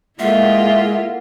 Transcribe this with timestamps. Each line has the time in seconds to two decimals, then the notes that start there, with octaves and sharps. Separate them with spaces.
0.20 G#3 A#3 E4 F4 A4 A#4 E5 F#5